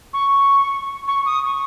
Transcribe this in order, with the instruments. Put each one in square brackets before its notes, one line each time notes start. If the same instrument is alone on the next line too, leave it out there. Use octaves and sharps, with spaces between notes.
[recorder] C#6
C#6
D#6
C#6